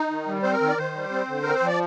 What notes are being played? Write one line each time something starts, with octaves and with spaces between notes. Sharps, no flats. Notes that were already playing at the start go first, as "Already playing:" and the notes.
Already playing: D#4
D#3
G3
C4 C5
A#4
D#3
D5
D#3 C5
G3
C4
D3
C4 A#4
C5
F3 D5